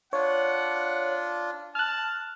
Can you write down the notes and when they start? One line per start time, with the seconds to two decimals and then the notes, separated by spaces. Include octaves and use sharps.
0.13 D4 F4 C#5 F#5
1.75 A5 F6 F#6